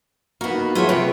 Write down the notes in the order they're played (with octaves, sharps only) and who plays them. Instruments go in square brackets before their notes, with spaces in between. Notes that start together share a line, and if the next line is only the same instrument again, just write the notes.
[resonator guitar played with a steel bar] A#3 B3 [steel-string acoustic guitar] D#4 F#4
[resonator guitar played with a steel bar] A3 C#5 [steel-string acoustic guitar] F4 G#4 E5
[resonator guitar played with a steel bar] C3 C4 B4 [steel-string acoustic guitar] C#5